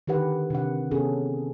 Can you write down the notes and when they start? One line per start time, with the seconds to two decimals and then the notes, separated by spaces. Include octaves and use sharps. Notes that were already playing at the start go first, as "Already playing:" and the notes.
0.07 D3 D#3 G4 B4 F#5
0.50 C3 D4 F#5
0.91 C3 B3 C#4 G#4 A4